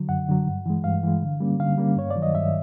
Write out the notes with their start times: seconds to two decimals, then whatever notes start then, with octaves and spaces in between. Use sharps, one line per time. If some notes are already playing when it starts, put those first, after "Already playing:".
Already playing: D3 F#3
0.09 F#2 F#5
0.29 D3 F#3
0.47 G2
0.66 E3 G#3
0.84 G2 F5
1.03 E3 G#3
1.22 D3
1.40 G3 A#3 C#4
1.60 D3 F5
1.78 G3 A#3 C#4
1.97 G2 C#5
2.11 D5
2.16 D#3 F#3
2.22 D#5
2.35 G2 E5